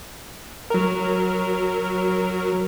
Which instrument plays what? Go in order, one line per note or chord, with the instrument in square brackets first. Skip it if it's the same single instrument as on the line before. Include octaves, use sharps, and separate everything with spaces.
[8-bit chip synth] F#3 A#4